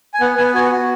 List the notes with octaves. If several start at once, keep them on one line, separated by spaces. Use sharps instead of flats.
G#5
B3 F#5
B3 G#5
F#4 G#5
F#5
F#4